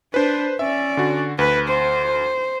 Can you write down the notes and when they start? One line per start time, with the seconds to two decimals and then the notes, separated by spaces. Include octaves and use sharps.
0.14 D4 B4 C5
0.59 C#4 D5 E5
0.97 D3 F#4
1.39 D2 B4
1.68 C5